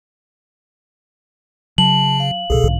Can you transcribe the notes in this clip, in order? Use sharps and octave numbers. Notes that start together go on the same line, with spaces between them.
C#3 F#3 A5 F#7
F5
C2 B2 G#4 A4
B1 G#2 D3